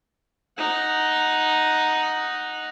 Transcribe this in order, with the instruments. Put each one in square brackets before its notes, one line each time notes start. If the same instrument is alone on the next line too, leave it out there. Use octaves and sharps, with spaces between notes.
[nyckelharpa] D#4 F#5